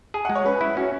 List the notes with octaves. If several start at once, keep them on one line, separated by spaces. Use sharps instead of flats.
G#4 G#5
F#5
G#3
C#5
C#4 B4
E4
C#4 F#4